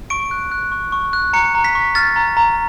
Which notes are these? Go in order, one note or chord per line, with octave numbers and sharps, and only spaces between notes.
C#6 D7
F#6
F#6
C#6
C#6
F#6
A#5 C#7
A#5
B6
C#6
F6 A6
A#5
A#5